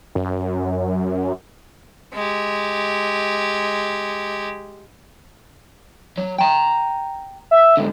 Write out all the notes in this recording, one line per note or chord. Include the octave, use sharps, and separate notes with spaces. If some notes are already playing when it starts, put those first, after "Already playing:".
F#2
G#3 G4
F#3 C#5
G5 A#5
E5
G#2 D3